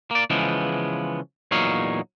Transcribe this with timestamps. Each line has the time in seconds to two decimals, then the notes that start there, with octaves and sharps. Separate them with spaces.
0.11 A#3 D5
0.30 C#3 E3 F3 G#3 B3
1.51 E2 A#2 F#3 D#4 C#5 F5